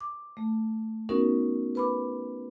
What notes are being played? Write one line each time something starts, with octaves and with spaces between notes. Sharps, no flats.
D6
A3
B3 C#4 D#4 F#4 A#4
B4 B5 D6